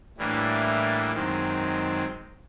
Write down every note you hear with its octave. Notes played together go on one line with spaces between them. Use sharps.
A2 E3 G3 A#3 D4
F#2 D#3 G#3 C4